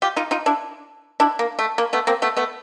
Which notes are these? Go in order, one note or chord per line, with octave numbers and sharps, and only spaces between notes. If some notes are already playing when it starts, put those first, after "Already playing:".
F4 G4
D#4 F4
D#4 F4
D4 E4
D4 E4
A#3
A3
A#3
A3 B3
A#3 C4
A3 B3
A3 B3